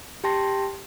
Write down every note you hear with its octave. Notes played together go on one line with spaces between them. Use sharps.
G4 G5 A5 C6 A#6